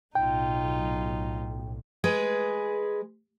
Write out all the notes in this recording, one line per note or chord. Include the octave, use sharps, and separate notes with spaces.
B1 A2 D#4 F4 G5
G#3 G#4 B4